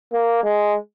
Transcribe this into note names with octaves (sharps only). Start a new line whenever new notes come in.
A#3
G#3